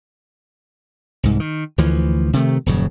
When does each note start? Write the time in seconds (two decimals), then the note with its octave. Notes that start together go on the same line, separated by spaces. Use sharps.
1.23 C2 G#2
1.40 D#3
1.78 D2 E3 F3
2.33 C3 D#3 A3
2.66 D#1 F#2 C#3